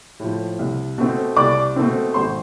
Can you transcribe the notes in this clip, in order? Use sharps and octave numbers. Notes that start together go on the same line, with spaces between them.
A2 F3
C2
B2 A3 C4
C2 D5 D6
B2 A3 C4
G#1 C5 C6